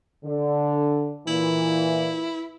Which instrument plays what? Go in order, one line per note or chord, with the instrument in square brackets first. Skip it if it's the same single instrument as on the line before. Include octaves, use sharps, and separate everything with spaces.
[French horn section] D3
[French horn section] A#2 E3 [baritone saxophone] E4